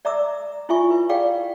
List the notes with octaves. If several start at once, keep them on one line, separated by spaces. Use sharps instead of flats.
D5 E5 A#5 D6 E6
E4 F4 E5 G#5 C#6
B4
G#4 D5 F5 G5